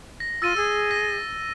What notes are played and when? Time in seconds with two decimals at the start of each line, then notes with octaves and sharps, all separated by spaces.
0.20 A#6
0.42 F4 E6 A6 D#7
0.57 G#4 E6
0.91 A#6